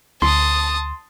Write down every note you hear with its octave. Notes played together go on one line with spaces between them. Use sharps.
D2 A5 C6 D#6